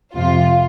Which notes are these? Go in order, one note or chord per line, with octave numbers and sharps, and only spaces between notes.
F2 C3 F3 F4